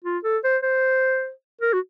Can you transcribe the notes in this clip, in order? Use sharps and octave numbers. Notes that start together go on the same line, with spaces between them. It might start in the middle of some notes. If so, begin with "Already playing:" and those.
F4
A4
C5
C5
A#4
F#4